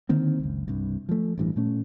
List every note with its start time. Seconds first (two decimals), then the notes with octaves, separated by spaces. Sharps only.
0.09 D3 D#3 A#3 C4
0.40 F#1 C#2
0.68 C2 G2
1.09 F3 A3
1.38 A1 G2 E3
1.56 A#2 A3 C#4